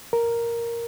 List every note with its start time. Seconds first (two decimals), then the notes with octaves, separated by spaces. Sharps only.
0.13 A#4